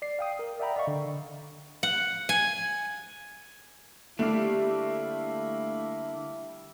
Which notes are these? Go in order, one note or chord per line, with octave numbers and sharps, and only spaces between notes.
D5 C7
F5 G5 D#6
A#4
D5 E5 F#5 G5 A#5 B5
D5 D#5 F5 C#6
D3
F#5
G#5
D3 G3 A3 A#3 E4